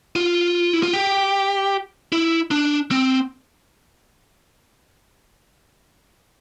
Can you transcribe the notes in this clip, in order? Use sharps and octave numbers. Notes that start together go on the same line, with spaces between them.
F4
E4
F4
G4
E4
D4
C4